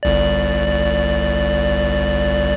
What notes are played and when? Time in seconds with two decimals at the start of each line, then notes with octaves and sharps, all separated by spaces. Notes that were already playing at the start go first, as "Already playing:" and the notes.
0.03 G1 C2 D5